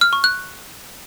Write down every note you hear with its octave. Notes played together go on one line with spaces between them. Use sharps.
F6
C#6
F#6